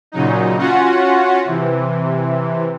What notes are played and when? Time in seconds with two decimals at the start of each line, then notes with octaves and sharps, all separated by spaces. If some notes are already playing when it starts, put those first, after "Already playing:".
0.12 A#2 C#3 F#3 D#4
0.58 C#4 F4 F#4 F#5
1.44 C3 E3